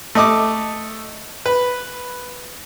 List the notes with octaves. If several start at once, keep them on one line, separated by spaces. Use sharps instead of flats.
A3 D#5 D6
B4